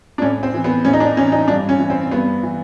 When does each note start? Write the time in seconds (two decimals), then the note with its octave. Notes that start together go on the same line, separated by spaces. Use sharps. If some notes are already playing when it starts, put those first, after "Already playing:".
0.18 D4
0.22 A2 C#4
0.43 C4
0.54 E3
0.64 B3
0.85 A2 C#4
0.93 D#4
1.00 D4
1.16 E3 C#4
1.32 D#4
1.48 G2 D4
1.69 C#4
1.79 E3
1.90 C4
2.12 G2 B3
2.43 E3